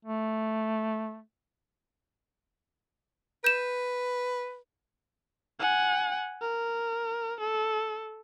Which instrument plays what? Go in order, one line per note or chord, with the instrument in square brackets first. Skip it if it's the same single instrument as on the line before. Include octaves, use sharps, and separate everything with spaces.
[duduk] A3
[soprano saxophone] B4 [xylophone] G6 E7
[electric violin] F#5 G#5
A#4
A4